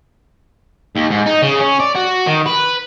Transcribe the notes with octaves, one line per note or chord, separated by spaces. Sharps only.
D#2
G#2
D#4
C#3
C#4
D5
F#4
D#3
B4